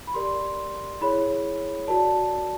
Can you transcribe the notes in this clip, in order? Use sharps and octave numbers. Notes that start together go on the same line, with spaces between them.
B5
G4 A#4 D5 C6
E4 G#4 C#5 B5
F#4 A#4 D5 A5